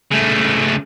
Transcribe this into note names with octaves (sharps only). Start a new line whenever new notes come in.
C#3 A3